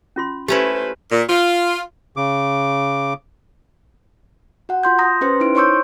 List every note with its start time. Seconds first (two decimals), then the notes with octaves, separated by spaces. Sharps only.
0.16 C#4 F4 C6
0.48 A3 C#4 E4 G4 B4 C5
1.12 A#2
1.29 F4
2.17 C#3 D6
4.69 F#4 F#5
4.83 F4 C6 G6
4.99 A#5 D#6 A#6
5.21 C#4 G4 B4 C5 C6
5.40 D#4 E4 D7
5.55 C5 C#5 C6 C#6 E6 G6